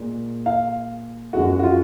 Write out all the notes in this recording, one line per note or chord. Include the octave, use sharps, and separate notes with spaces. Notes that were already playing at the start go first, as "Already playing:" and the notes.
Already playing: A#2 G#3
F5
F#2 F3 G#3 F#4
F#4
F4